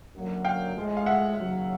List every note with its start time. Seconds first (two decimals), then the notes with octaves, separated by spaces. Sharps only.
0.14 F#2 D3 F#3 A#3
0.44 F5 G5
0.76 A2 F3 G#3
0.97 F5
1.06 E5 F#5
1.37 D#2 C#3 F#3